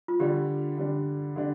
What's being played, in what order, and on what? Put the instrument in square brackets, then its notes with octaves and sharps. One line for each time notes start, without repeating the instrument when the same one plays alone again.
[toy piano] F4
[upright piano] D3 G3 D4 [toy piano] G4
[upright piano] D3 G3 D4
D3 G3 D4